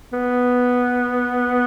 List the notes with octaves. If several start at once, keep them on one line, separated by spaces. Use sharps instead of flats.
B3